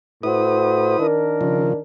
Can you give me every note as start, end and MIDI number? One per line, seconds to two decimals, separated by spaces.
0.23 0.98 45
0.23 1.07 64
0.23 0.98 66
0.23 1.07 71
0.23 0.98 72
0.23 1.07 87
0.99 1.80 51
0.99 1.80 62
0.99 1.80 70
1.41 1.73 49
1.41 1.73 53